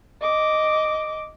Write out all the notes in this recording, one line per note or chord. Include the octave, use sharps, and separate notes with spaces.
D#5 D6